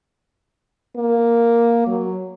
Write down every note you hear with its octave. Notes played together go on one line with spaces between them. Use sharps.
A#3
F#3